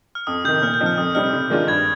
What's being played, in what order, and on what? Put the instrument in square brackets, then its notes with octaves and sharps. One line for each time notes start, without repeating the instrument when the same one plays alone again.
[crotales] F6
[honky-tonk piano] F2 [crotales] D#6
[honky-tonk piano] C3 D#3 [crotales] G6
[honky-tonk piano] A#2 [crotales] F6
[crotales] G6
[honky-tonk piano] F3 C4 D#4
[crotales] F6
[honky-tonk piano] F2 [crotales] D#6
[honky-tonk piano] C3 G3 C4 D#4 [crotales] F6
[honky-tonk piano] C3
D#3 G#3 D4 F4
[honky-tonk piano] G2 [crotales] G#6